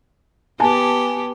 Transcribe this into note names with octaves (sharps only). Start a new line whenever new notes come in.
B3 G4 G#5 A5